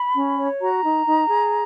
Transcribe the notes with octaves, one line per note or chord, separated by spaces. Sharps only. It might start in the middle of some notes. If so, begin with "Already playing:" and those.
Already playing: B5
C#4
C#5
F#4 A#5
D#4
D#4
G#4